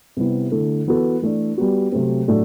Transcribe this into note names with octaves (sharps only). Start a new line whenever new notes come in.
C3 G3 B3 E4
D3 A3 E4 A4
E3 B3 F#4 A4
E3 A3 D4
G3 B3 F#4
C3 F#3 A3 C4
A2 F#3 A3 D4